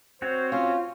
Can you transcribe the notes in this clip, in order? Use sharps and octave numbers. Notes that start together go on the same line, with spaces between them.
C4 F#4 C5 C#5
C#4 F4